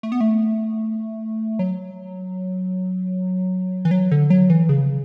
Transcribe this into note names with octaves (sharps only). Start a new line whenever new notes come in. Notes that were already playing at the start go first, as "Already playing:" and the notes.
A3
B3
A3
F#3
E3
F#3
D3
F#3
E3
C#3